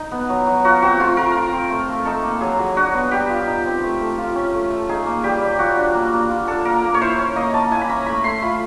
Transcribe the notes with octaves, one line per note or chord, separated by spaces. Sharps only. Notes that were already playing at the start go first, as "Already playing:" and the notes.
Already playing: D#4
B3
F#3
F#3
F4 F#4
C4 F#4
A3 F4
A3 A#4
F4
C4
A3
A3
D#4 A4
A#3
F#3 G#4
F#3
D4 F#4
B3
G3 G4
F4
D#4
C4
A3
A3
F4
C#4
A3
A3
D#4 G#4
A#3
G3 G4
G3
F4 F#4
D4
A#3
A#3
F4
D4 A4
A#3 A#4
A#3
C#5
E4 C5
C#4 C#5
A#3 D#5
A#3 A5
E4 G#5
B5
C#4 A#5
A3 B5
A3 C6
F4 B5